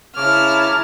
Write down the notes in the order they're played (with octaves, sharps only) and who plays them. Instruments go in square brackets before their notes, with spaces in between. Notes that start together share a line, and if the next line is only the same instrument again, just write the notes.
[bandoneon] C#3 C#5 D6 [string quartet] E4 A5 A#5 [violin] F6